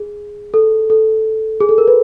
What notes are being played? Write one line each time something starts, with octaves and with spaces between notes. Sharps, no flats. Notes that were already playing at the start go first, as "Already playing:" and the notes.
Already playing: G#4
A4
A4
G#4
A4
A#4
B4